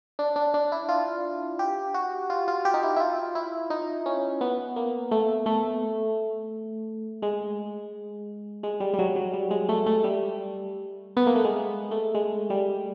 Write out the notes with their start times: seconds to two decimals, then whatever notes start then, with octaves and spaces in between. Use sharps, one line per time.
0.19 D4
0.36 D4
0.54 D4
0.72 E4
0.89 F4
1.59 G4
1.94 F#4
2.30 F4
2.48 F4
2.65 G4
2.74 D#4
2.83 E4
2.96 E4
3.00 F4
3.35 E4
3.70 D#4
4.06 C#4
4.41 B3
4.76 A#3
5.11 A3
5.46 A3
7.22 G#3
8.63 G#3
8.80 G3
8.94 G3
8.99 F#3
9.16 F#3
9.33 G3
9.51 G#3
9.69 A3
9.86 A3
10.04 G3
11.17 B3
11.27 A#3
11.35 A3
11.45 G#3
11.91 A3
12.15 G#3
12.50 G3